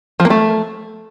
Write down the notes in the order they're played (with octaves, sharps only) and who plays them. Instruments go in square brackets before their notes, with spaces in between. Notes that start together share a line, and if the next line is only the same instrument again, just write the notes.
[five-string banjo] F3
A#3
A3